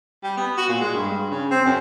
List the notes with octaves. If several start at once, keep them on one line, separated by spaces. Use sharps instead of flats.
G3
B3
F#4
A#2
G#3
G2
C#3
C4
F#2